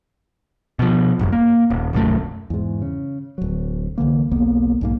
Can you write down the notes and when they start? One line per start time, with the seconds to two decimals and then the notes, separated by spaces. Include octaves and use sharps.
0.79 B2 F3
1.19 D1 G1 F#2
1.32 A#3
1.70 D#1
1.93 D1 B1 F#2 A3
2.50 E2 G#2
2.82 C#3
3.38 D1 F#3
3.98 C2 D3 E3 A#3
4.31 B1 E2 A#3 B3
4.81 B1 G#2 A#3